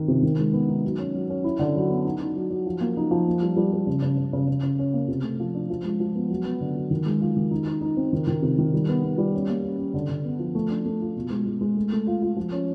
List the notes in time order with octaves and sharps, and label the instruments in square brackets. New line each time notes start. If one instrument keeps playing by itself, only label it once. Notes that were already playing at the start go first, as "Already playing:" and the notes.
Already playing: [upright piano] D#3 C4
C3
D#3
G#3
B3
D#4
F#3
C#4
F#3
C#4
E4
D3
F#3
B3
D#4
D#4
F#3
F#3
F3
A#3
D#4
F3
A#3
G3
G3
G3
C#3
C#3
C#3
C#3
C#3
C#3
C#4
A#3
C3
A3
F3
D4
F3
G#3
F3
B3
F#3
B3
D3
F#3
D#3
G#3
F4
D#3
D#4
D#4
D#4
C4
D#3
D#3
C3
D#3
G3
B3
B3
G3
C#4
A#3
C#4
C#4
D3
D3
B3
F3
A3
D4
A3
F4
B2
G#3
G#3
G#3
A3
A3
F4
F4
F3
C#4